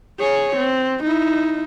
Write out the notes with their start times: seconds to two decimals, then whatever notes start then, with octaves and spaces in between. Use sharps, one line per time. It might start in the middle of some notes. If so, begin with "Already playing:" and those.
0.19 G#4 C#5
0.57 C4
1.04 D#4 E4